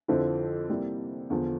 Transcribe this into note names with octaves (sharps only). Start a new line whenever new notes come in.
F2 D3 F3 C4 E4
C3 G3 A#3 E4 A#4
E2 D3 F3